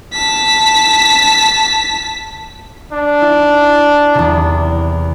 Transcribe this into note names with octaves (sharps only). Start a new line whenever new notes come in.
A5 B6
D4
E4
E2 C3